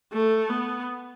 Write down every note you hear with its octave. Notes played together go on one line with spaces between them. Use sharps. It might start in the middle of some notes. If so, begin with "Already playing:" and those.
A3
B3